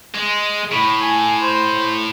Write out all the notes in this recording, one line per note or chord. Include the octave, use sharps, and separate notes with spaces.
G#3
A2 B5
G#5
C5